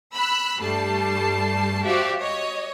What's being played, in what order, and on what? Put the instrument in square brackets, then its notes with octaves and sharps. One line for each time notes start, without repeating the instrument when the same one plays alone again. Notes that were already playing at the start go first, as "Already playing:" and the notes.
[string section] B5 E6 F#6
G2 G3 A3 A5 C7
F#4 G4 C5 D5 E5 F5
C#5 D#5